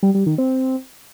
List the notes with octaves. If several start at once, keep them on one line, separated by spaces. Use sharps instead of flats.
G3
G3
D#3
C4